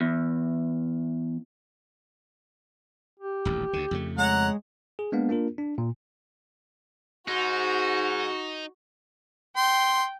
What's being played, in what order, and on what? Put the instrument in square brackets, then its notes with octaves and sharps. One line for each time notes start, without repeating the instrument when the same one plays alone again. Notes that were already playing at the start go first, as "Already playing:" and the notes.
[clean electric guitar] E2
[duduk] G4
[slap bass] D#1 A1 D2
D2 D3
F2 C#3 A3
[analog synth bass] G#3 [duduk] C#5 [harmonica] F#5 A#5
[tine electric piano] G#4
G#3 A#3 B3 D4 F5
A#3 D4 F4 A#4
D4
A#2
[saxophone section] G#2 [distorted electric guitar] D#4 [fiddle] F#4
[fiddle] G5 [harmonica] C6